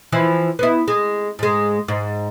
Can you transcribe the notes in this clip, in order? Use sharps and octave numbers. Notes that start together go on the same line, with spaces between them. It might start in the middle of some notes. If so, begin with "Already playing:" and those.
E3 F3 E4
B3 E4
G#3
G#2 G#3
G#2